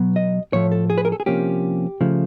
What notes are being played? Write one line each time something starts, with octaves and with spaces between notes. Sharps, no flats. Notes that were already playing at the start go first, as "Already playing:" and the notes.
Already playing: B2 F#3 B3
D#5
A2 F3 A3 C#5
A4
G#4
B4
A#4
A4
G#4
C3 F3 A#3 C#4 G4
C#3 F3 A3